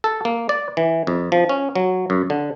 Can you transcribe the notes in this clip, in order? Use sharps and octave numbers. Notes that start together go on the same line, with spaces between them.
A4
A#3
D5
E3
F2
F3
C#4
F#3
F#2
D3